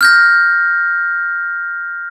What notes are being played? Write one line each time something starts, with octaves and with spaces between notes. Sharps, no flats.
F6 G6 A#6